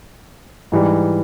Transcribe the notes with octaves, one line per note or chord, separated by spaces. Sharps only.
G#2 E3 G3